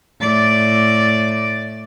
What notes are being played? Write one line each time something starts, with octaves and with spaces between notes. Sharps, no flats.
A2 D5